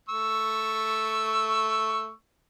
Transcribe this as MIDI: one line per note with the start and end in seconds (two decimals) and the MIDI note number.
0.09 2.12 57
0.09 2.12 85
0.09 2.12 88